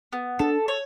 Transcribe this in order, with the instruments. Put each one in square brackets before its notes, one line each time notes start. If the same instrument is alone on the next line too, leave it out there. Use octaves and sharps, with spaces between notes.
[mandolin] B3
[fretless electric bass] D4 [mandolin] A4
[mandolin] C#5